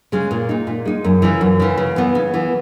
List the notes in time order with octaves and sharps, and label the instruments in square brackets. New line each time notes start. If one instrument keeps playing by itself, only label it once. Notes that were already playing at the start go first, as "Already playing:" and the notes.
[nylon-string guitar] C#3 G#3 C#4
A#2
G#3 D#4
A#2
G#3 D#4
F#2
C#3 E3
F#2
C#3 E3
C#3
E3 B3
C#3
E3 B3